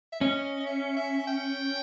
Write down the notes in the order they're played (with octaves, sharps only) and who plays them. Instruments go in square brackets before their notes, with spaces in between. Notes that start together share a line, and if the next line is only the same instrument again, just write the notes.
[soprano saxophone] E5
[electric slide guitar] C#4 [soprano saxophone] D#5
[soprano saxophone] D#5
E5
E5
G5